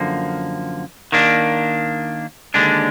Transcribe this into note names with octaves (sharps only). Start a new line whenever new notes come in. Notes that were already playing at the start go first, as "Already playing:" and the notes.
Already playing: F#2 D3 F3 A#3
D#3 A#3 D4
D#2 D3 G#3 D4